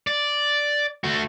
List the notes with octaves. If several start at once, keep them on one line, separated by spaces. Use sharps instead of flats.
D5
A3 F#4